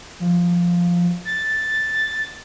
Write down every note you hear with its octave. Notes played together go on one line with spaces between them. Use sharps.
F3
A6